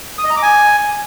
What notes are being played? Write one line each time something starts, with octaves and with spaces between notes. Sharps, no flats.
D#6
D#5
A#5
D6
G#5